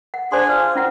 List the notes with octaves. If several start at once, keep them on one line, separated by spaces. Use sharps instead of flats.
F#5
D4 G#4 C5 C6
F4
C#4 E4 F#5